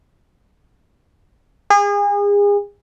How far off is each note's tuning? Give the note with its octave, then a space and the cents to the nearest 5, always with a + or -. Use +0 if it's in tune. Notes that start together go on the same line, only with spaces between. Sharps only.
G#4 -35